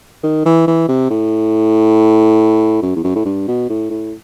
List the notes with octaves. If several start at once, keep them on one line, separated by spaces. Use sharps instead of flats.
D#3
E3
E3
C3
A2
F#2
E2
F#2
A2
G2
B2
A2
A2